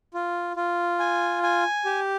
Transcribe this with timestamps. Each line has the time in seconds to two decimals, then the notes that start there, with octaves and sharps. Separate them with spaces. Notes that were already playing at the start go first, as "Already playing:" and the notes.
0.14 F4
0.56 F4
0.99 G#5
1.43 G#5
1.85 G4